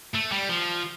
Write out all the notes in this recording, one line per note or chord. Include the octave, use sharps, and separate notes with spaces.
A3
G3
F3